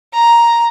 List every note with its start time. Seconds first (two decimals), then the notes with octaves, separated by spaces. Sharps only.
0.14 A#5